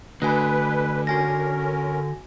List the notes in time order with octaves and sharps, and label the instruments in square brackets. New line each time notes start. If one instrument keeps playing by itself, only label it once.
[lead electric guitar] D3 [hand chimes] A3 F#4 G#5 [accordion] B4
[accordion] C#4 A#4 [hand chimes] F#4 G#5 A#6